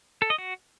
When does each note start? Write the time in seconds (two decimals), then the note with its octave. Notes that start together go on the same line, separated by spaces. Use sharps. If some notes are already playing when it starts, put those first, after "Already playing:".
0.22 A4
0.30 D#5
0.38 F#4